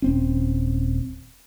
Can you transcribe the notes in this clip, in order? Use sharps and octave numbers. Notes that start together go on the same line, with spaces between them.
D#1 C4 C#4